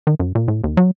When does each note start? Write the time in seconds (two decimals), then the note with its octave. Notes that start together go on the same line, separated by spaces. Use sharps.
0.07 D#3
0.20 F#2
0.35 A#2
0.48 A2
0.64 D#2
0.77 F#3